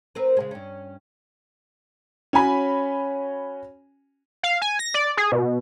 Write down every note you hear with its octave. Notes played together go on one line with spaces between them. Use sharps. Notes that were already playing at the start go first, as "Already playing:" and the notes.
C4 A#4 B4
C#3 G#3
G2 C#4
C#4 F#4 C#5 G#5 B5
F5
G#5
A#6
D5
G#4
B2